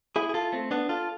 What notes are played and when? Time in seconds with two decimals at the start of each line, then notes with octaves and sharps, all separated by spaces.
0.16 E4 G#4
0.29 G#4
0.34 F4 A4
0.53 A3 C4
0.71 B3 D4
0.89 F4 A4